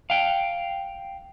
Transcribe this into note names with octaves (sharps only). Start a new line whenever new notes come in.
F5 G5